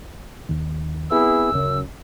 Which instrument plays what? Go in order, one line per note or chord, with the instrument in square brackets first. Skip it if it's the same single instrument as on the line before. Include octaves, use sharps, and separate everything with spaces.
[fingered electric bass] D#2 D#3
[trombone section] B3 E4 G#4 [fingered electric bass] C4 [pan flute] E6
[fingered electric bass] D1 C#3 [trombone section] F#2